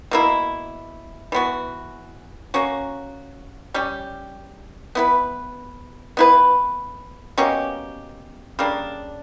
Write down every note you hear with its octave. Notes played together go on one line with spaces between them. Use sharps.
B2 A#3 E4
E3 B3 F#4
A#3 C#4 F#4
G3 C#4 G4
B3 E4 B4
B3 E4 B4
B2 A#3 C#4 G4
C#3 G3 A#3 D4